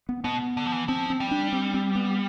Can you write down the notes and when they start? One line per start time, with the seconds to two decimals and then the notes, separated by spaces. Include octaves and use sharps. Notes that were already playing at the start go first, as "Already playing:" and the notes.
0.09 B3
0.24 B2 B3
0.57 D3
0.66 F3
0.72 E3
0.88 F3 C4
1.10 C4
1.20 G3
1.31 D4
1.53 C4
1.74 C4
1.95 B3